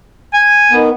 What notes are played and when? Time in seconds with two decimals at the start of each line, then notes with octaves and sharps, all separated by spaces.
0.34 G#5
0.71 D#3 B3